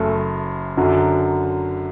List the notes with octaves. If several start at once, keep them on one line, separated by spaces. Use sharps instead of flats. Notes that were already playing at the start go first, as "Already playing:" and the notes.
Already playing: F#1 F#2 A3
F#2 D3 F#3